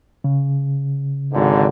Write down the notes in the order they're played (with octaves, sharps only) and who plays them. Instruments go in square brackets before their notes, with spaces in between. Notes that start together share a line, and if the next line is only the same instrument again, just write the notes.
[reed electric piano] C#3
[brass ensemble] G#1 G#2 D3